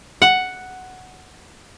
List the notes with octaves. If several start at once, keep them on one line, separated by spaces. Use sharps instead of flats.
F#5